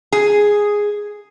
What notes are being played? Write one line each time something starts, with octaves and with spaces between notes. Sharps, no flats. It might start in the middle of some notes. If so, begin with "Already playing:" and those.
G#4